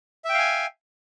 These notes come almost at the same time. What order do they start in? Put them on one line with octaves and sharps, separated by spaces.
E5 G5 F5 G#5